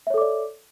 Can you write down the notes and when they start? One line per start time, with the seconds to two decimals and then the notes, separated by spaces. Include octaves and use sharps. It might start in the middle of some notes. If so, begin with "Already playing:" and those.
0.07 E5
0.10 C#5
0.14 A4
0.18 D6
0.21 D5